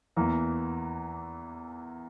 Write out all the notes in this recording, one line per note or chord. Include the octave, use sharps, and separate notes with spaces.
E2 E3 A#3